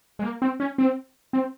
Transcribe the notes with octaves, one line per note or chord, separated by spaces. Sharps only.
G#3
A#3
C4
C#4
C4
C4